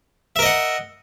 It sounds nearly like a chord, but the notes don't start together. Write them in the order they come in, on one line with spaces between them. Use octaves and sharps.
E5 A#4 D#5 F#5